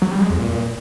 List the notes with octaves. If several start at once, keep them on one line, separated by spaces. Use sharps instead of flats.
F#3
G3
G#3
F2
A#2